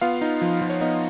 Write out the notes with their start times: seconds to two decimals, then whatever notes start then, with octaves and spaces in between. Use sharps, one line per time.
0.01 B3 F4 F5
0.21 D#4
0.42 F3
0.61 F3
0.70 C#5
0.81 B3 D#4 D#5